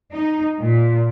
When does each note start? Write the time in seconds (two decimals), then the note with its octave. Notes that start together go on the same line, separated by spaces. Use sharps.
0.12 D#4
0.60 A#2